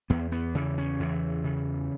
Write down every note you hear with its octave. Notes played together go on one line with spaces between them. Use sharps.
E2 B3
B3
C#3 E3
C#4
E2 E3
C#3